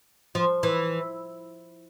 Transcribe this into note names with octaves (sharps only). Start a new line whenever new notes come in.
F3
E3